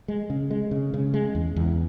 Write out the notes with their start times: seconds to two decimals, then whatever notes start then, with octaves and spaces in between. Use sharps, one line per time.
0.08 G#3
0.30 C#3
0.51 G#3
0.71 C#3
0.94 C#3
1.14 G#3
1.35 E2
1.56 E2